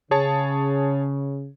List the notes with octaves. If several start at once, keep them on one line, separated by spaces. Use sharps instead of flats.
C#3 G#4 C#5 A5